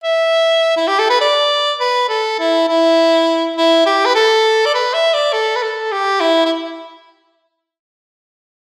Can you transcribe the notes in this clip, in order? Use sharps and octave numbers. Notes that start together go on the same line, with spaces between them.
E5
E4
G4
A4
B4
D5
B4
A4
E4
E4
E4
G4
B4
A4
D5
B4
E5
D5
A4
B4
A4
G4
E4
E4